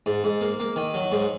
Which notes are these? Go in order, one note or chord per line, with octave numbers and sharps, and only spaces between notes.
G#2
G#2
A#3
A#3
D#3
F#3
G#2